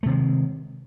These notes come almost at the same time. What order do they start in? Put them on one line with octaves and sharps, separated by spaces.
A3 C3 D#3 G#3